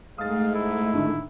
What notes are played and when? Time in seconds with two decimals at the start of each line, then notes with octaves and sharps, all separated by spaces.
0.18 G#2 G#3 A3 F5 D#6 A6
0.55 E4
0.93 A2 D3 D#3